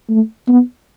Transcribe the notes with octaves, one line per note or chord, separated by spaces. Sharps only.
A3
B3